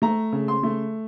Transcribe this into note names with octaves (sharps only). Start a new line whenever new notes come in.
A3 A#5
C#3
C6
A3